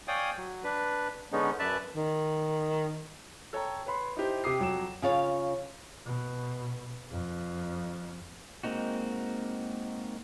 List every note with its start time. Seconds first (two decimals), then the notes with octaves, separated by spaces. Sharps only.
0.08 C#5 D5 F5 G5 G#5 D#6
0.37 F#3
0.64 D4 B4
1.32 D3 G#3 B3 C#4 D#4
1.59 F#2 B4 D5 E5 A5
1.96 D#3
3.53 A4 C#5 G5 A#5
3.86 B4 C#5 B5 C6
4.17 D#4 E4 G4 C5
4.44 C3 G4 G5 D6 D#6 C7
4.60 F2 F#3 G5 D6 E7
5.02 C#3 F4 C#5 F5
6.05 B2
7.11 F2
8.63 G#3 A#3 C4 D#4 F#4